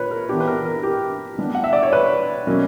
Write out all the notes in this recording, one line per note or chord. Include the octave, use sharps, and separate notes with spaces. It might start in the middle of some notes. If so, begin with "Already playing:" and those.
Already playing: A#2 B4 C#5
A#4
E3 B3 D4 G4
B4
A#4
A#4
G4
D3 G3 B3 D4
F#5
E5
D5
C#5
B4
B2 F#3 A#3 C#4